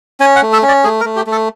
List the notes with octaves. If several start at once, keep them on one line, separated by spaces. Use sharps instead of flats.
C#4 G#5
F#5
A3
E5
C#4
D5
A3 G#4
A#4
A3
G4
A3
A4